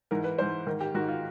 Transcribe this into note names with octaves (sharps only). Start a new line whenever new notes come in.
G#2 E3 A#4
B4
G#2 E3 C5
G#2 D#3 A#4
G4
G#2 D#3 F#4
F4